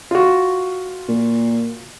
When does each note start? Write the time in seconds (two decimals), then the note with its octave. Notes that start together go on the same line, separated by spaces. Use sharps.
0.11 F4 F#4
1.08 A#2